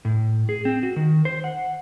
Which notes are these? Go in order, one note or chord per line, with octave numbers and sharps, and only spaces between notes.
A2
G#4
C4
F#4
D#3
C5
F#5